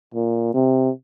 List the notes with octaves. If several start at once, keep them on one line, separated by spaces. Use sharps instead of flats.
A#2
C3